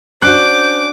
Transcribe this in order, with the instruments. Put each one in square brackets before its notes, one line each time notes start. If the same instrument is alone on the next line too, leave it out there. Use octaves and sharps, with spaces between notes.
[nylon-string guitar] C#4 D4 F#4 [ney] C5 [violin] D6 [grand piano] F#6